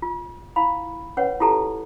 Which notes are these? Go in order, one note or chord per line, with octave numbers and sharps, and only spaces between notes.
F4
E4 F5 B5
C#4 B4 C#5 F#5
E4 F4 G4 A4 A5 A#5